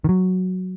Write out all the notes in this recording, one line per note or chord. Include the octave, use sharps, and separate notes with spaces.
D#3
F#3